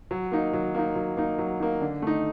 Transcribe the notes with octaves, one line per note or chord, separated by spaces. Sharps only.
F#3
A#3 D#4
F#3
A#3 D#4
F#3
A#3 D#4
F#3
A#3 D#4
D3
A3 D#4